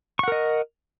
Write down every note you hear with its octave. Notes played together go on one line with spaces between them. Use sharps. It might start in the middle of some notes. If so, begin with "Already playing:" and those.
A#4 D#5 F#5 C#6